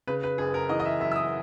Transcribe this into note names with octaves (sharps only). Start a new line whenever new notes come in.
C#3 B4
B4
F#1 G#4
A#4
E3 D#5
D#5
E5
F#2 E5
E6
D#6